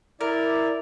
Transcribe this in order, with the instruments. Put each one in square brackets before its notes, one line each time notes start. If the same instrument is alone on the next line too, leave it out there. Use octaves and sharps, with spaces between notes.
[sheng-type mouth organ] E4 D5 [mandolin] A#4